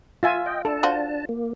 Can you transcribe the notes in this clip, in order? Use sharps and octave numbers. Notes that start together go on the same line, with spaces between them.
F4 E5 G#5
D#5 G5
D4 A4 A5
F4 F#4 C5
A#3